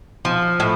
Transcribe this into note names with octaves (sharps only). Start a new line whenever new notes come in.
F3
A2